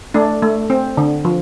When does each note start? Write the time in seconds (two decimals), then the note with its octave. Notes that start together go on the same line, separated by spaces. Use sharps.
0.14 A3 D4
0.42 A3
0.70 C4
0.97 D3
1.25 F3